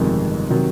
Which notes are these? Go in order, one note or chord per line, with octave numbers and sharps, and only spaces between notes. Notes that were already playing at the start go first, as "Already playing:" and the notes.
Already playing: G1 F2 C3 D#3 G#3
C3 D#3 F#3